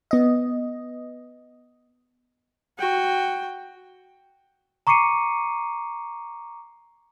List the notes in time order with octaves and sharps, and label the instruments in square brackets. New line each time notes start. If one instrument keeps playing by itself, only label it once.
[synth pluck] B3 D#5
[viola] F#4 G5
[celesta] A#5 C#6 D6 C7 C#7 D#7